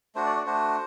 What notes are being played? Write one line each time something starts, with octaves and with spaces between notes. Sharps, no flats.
A3 D4 F#4 C5
D5
D5
A3 D4 F#4 C5